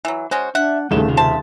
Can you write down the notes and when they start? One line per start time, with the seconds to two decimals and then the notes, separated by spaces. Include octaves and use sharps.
0.05 E3 F#3
0.31 G#3 C#4 F#4 C5
0.55 D4 E5 F#5
0.91 D#1 C#3 G3 A3 D#4 E4 E7
1.05 C3 F4
1.17 C5 E5 A5